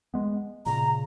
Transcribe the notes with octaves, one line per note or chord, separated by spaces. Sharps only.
G#3 B3
A#2 C#3 A#5